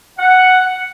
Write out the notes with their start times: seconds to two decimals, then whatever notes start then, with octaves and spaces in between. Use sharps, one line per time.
0.18 F#5